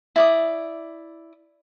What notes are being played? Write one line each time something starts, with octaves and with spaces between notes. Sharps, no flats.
E4 D5 D#6